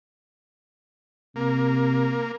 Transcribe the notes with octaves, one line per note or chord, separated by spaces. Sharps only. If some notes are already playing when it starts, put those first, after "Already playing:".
C3 A#3